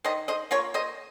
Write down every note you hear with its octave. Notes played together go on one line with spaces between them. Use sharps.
D#3 C5 D#5
C5 D#5
A#3 F4 A#4 C#5
C5 D#5